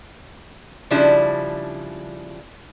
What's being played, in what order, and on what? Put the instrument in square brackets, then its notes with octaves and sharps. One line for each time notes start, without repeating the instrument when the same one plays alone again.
[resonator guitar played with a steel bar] C#3 F3 G3 D4 E4